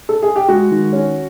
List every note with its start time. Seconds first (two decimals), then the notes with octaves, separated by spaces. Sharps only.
0.09 A4
0.22 G#4
0.36 G4
0.49 G#3 F#4
0.71 D#3
0.93 C#4